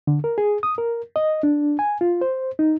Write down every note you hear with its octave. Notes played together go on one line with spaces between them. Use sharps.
D3
A#4
G#4
D#6
A#4
D#5
D4
G#5
F4
C5
D#4